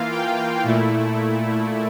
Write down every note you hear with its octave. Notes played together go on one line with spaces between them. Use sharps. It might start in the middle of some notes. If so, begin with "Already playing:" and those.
Already playing: E3 A#3 F4 F5
G5
A#2 A3 E4